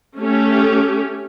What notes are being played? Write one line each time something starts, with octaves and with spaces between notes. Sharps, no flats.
A3 C#4 G4